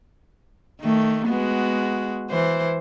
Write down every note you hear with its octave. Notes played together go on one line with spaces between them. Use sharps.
D#3 A3
G#3 B3 F#4
E3 C5